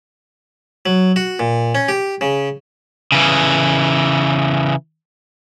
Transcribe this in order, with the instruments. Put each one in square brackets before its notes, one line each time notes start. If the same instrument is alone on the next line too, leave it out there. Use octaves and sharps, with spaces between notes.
[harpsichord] F#3
F#4
A#2
C#4
G4
C#3
[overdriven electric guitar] C#3 E3